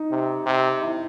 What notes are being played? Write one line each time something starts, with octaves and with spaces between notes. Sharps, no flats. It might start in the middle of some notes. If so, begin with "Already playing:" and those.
Already playing: D#4
C3
C3
E4